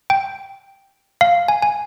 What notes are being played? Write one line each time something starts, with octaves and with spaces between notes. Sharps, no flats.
G5
F5
G#5
G#5